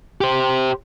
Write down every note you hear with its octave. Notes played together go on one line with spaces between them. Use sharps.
G4 C5